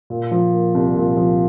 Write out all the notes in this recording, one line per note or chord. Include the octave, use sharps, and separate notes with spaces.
A#2
F3
A#3
C2
A#2
F3